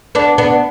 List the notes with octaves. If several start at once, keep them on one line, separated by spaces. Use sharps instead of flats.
B3 D4
B3 D4